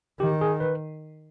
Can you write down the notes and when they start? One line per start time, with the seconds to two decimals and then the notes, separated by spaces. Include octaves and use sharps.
0.20 D#3 G4
0.41 G#4
0.60 B4